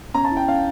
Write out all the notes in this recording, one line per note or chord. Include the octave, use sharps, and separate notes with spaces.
C#4 A#5
A5
E4
G5
C#4 F5